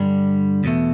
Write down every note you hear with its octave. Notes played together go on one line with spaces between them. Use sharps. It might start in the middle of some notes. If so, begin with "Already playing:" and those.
Already playing: G2 D3 G3
E2 B2 A3